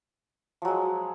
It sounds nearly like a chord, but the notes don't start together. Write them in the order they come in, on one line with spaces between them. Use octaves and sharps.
F3 F#3 G#3